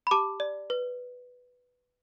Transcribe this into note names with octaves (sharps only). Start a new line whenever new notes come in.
B5
G4 A5 D6
D5
B4